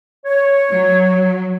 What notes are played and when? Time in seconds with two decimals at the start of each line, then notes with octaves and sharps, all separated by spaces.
0.25 C#5
0.71 F#3